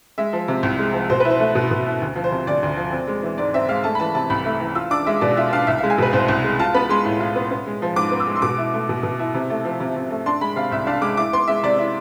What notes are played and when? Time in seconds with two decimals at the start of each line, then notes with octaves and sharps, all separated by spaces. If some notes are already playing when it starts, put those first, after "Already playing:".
0.18 G#3 E5
0.33 F3
0.48 C3
0.63 C2
0.79 G#3
0.93 F3
1.10 B2 C5
1.20 E4 B4
1.30 C5
1.40 A3
1.55 B2
1.71 B2
1.86 E4
2.01 D2
2.16 F3
2.24 C5
2.32 C3
2.47 D2 D5
2.63 D2
2.77 F3
2.92 C4
3.07 G#3
3.23 E3
3.38 G#2 D5
3.54 C4 E5
3.69 G#3 F5
3.84 A3 A5
3.95 B5
4.00 E3 A5
4.14 C3 A5
4.30 C2 B5
4.45 A3
4.61 E3
4.75 F4 E6
4.91 D4 D6
5.06 G#3 E5
5.21 B2 D5
5.37 F4 E5
5.53 D4 F5
5.67 C2 E5
5.78 F5
5.83 G#3
5.90 G#5
5.98 B2 B4
6.13 C2 C5
6.28 C2
6.44 G#3
6.59 F4 A5
6.74 B3 B5
6.89 G#3 C6
7.05 A2
7.20 F4
7.36 B3
7.51 B3
7.67 G#3
7.82 F3
7.96 G#2 D6
8.11 B3
8.20 E6
8.27 G#3
8.36 C6
8.42 B2 D6
8.58 E4
8.74 A3
8.89 B2
9.03 B2
9.19 E4
9.34 C3
9.50 A3
9.65 F3
9.80 C3
9.96 C3
10.10 A3
10.26 D4 C6
10.41 G#3 B5
10.56 C3 F5
10.72 C2 E5
10.86 D4 F5
11.02 G#3 D6
11.17 E4 D6
11.33 B3 C6
11.48 G#3 E5
11.63 C3 D5
11.78 E4